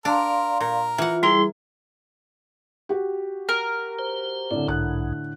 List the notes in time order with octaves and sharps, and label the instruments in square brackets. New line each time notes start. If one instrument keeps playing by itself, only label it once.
[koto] D4 [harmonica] A#4 [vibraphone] D5 F5 C6
[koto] A#2 [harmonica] A#4
[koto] E3 F#5 [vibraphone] F4
[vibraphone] G3 E4 G#4 [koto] A#4 [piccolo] C6
[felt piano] F#4 G4
[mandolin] A#4
[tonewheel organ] C5
[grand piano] A2 D3 [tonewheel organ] C4 [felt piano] D5
[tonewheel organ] B1 G#2 [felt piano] F#6